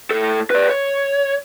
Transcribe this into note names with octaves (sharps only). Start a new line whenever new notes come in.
A2 A4
B4 D5
C#5